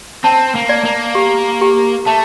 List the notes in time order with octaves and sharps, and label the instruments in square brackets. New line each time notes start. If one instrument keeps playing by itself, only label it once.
[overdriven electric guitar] C4 [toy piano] A5
[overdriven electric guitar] A#3
[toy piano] D5
[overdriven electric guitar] A#3
[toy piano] G4
G4
[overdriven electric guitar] A3 [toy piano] A5